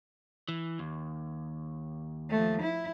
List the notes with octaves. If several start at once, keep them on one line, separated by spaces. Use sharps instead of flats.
E3
D#2
F3 A3
E4